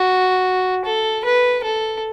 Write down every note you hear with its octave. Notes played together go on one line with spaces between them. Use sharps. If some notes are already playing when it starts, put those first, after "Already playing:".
Already playing: F#4
A4
B4
A4